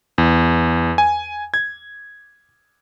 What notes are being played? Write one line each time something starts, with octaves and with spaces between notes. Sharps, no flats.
E2
G#5
G#6